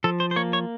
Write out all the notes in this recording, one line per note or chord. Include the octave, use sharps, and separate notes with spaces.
F3 A4
C5
C5
A#3 C#5
C#5